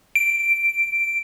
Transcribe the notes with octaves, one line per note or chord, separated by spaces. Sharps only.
D7